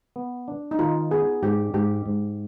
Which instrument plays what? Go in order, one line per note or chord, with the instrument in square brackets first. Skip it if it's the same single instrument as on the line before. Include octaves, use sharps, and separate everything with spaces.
[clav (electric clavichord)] B3
D4
[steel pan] D#4
[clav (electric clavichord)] D#3 [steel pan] F4
[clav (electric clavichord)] B3 [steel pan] G#4
[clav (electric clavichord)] G#2 [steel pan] G4
[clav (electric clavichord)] G#2 [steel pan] G4
[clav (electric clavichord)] G#2